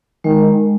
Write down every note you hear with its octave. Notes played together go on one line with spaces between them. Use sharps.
D#3 G#3